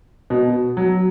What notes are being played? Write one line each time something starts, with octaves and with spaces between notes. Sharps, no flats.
B2
F#3